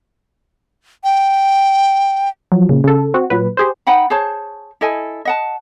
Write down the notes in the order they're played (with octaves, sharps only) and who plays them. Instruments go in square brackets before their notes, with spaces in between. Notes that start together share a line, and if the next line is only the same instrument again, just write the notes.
[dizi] G5
[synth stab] F3 F#3
A#2 C#3
C#3 A4
C4 F#4
A#2 F#3 B4
G4 G#4 C5
[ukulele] D#4 F#5 G5 B5
G#4 C5 C#5 A5
E4 A4 D#5 G#5
D#5 F#5 A5